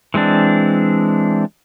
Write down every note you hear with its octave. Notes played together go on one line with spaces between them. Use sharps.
E3 G#3 C4 D4